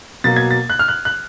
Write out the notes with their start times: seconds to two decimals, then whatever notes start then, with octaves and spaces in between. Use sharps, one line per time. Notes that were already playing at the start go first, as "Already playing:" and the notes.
0.24 B2 F#3 A#3 A6
0.36 G#6
0.51 A6
0.70 F#6
0.79 F6
0.88 F#6
1.05 F#6